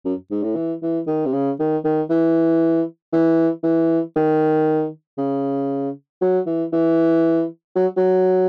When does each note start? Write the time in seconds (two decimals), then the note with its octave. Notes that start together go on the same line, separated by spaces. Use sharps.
0.05 F#2
0.31 G#2
0.43 A2
0.56 E3
0.82 E3
1.07 D#3
1.26 C3
1.33 C#3
1.59 D#3
1.84 D#3
2.10 E3
3.13 E3
3.64 E3
4.16 D#3
5.18 C#3
6.22 F#3
6.46 E3
6.73 E3
7.76 F#3
7.97 F#3